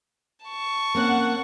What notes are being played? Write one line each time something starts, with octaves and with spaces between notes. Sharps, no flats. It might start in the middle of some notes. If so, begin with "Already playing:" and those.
A5 C#6
A#3 C4 C#4 F#5